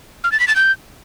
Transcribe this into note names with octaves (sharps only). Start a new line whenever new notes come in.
F6
A6
B6
A6
G6